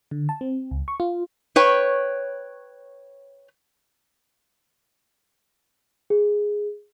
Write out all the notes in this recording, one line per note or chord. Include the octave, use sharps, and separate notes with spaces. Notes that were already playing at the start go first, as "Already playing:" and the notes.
D3
A5
C4
C#2
C#6
F4
B4 C#5 G5
G#4